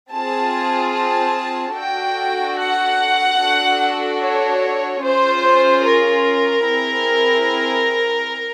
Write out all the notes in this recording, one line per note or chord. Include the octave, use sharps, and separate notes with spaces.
C4 F4 G#4 A5
A5
D4 F#4 A4 G5
F#5
D4 F#4 A4
C#5
C#4 F4 G#4 C5
A#4
C4 E4 G#4